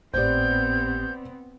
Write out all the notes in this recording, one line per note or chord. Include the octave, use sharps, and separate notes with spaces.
G#1 A2 B3 C4 G4 C5 D5 G6